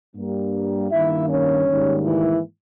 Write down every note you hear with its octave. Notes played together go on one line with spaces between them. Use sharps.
G2 G3 A#3
G2 D#3 A#3 E4 E5
C#4 C#5
G#2 D#3 G3 A#3
E3 E4